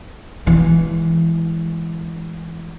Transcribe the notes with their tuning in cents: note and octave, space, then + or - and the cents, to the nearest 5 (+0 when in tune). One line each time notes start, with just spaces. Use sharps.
E3 +0 G#3 +0